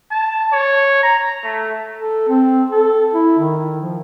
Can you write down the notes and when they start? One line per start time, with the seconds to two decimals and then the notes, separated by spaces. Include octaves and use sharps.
0.11 A5
0.52 C#5
1.03 A#5
1.43 A3
1.98 A4
2.29 C4
2.71 A4
3.14 E4
3.39 D#3
3.81 F3